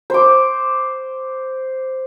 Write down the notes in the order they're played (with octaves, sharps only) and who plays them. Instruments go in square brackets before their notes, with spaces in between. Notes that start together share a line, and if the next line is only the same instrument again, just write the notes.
[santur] C5 D6